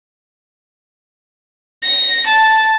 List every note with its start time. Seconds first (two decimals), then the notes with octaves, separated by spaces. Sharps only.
1.84 A#6
2.26 A5